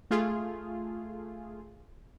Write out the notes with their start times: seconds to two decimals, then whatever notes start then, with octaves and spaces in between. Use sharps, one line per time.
0.11 A3 F4 G#4